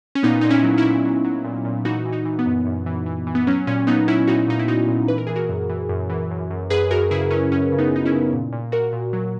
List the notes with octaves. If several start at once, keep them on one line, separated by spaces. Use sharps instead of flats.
C#4
A#2 B3 D#4
A#2 D#4
C#4 E4
F#3
C#4 E4
A#2
F#3
F#3
A#2
A#2
E3 D#4 F#4
E3
D#4 F#4
E3
B3
F#2
F#2
E3
E3
E3
B3
F#3 C#4
A#2 C#4
F#3 B3 D#4
F#3 C#4 E4
A#2 D#4 F#4
A#2 D#4
E4
A#2 D#4 F#4
A#2
E3 B4
A#4
E3 G#4
F#4 A#4
F#2
E3
F#2
E3
F#2
F#2
F#2 G#4 B4
F#2 F#4 A#4
C#3 E4 G#4
F#3 C#4
F#2 C#4
C#3
B3 D#4
F#2 D#4
C#4 E4
C#3
A#2
A#2
A#2 F#4 A#4
A#2
F#3